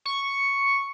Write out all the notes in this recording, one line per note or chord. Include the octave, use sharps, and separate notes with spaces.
C#6